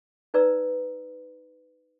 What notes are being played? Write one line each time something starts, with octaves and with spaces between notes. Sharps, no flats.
D#4 B4 D5 A#5 E6